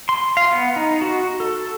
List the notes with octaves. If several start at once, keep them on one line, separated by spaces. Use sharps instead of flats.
C6
F5
B3
D#4
F#4
A4